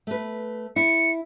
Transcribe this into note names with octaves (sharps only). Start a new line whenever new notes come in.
A3 B4
E4 C#7